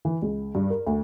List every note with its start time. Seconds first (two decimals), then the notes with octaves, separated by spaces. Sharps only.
0.05 E3
0.22 C#2
0.55 G2
0.70 A#4
0.87 D2